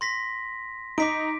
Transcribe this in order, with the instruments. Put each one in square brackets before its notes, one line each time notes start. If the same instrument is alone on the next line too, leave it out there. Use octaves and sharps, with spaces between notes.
[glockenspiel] C6 A#6 B6
[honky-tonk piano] D#4 [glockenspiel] D6 B6 D7